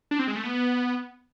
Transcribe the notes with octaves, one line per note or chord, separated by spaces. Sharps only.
D4
C4
G#3
A3
B3